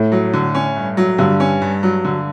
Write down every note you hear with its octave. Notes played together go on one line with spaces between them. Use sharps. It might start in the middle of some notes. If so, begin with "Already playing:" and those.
Already playing: A2
F#3
D3
C#4
G2
F#3
G2 D3
C#4
G2
F#3
D3